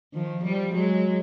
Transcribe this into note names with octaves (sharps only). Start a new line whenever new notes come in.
D#3 F3
F3 G3
F#3 G#3